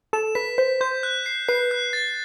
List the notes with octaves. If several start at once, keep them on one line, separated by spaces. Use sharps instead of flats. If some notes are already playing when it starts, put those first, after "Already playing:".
A4 E7
B4 B6
C5 B6
C5 G6
F#6
C7
B4 C7
F#6
A6